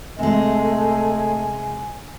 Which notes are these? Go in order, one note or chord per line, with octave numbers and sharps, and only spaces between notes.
C3 G#3 A3 D#5 G#5